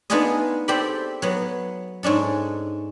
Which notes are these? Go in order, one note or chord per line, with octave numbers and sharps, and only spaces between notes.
B3 D4 D#4 F4 G#4 D#5
C4 G4 A4 D5 G5 B5
F#3 B3
G#2 C#4 D4 A4